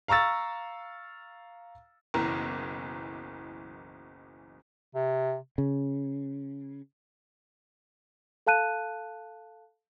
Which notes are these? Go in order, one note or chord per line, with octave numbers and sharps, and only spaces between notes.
F5 A#5 C#6 E6 A6
F#1 B1 E3 A#4
C3
C#3
A4 F5 A5 F#6 D#7